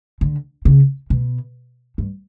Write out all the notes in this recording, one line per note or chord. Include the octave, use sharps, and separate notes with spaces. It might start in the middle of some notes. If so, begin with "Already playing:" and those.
D3
C#3
B2
G2